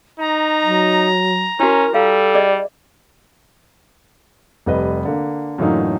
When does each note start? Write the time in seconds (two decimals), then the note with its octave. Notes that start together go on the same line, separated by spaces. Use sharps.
0.19 D#4 A#5
0.63 F#3
1.60 C#4 E4 F#4 A#4
1.94 G3 A4 F5
2.34 G#4 D5 D#5
4.66 F1 G3 B4 D#5
5.05 D3 A#3
5.58 F#2 A2 D3 E3 A#3 D#4